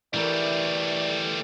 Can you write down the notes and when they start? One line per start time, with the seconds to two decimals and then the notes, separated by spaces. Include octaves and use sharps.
0.14 E3 G3 A3 A#4 D5